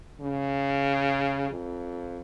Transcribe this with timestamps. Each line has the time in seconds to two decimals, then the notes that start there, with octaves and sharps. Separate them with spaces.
0.21 C#3
1.51 F2